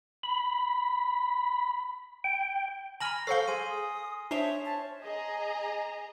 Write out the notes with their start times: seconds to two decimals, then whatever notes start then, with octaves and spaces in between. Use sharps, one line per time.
0.23 B5
2.24 G5
3.00 G#5 A#5 B5 F6 A#6 F#7
3.27 A4 C5 F5 C#6 C7 G7
3.47 G#4 G#5 C6 D#7
3.70 D#6
4.31 D4 C5 C#5 E5
4.65 A5
5.02 G#4 D#5 A#5